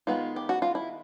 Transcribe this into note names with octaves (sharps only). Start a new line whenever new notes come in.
D#3 G#3 B3 D#4 F4
G4
F#4
F4
E4